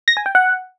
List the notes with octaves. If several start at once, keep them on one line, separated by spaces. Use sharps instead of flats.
A#6
G#5
G5
F#5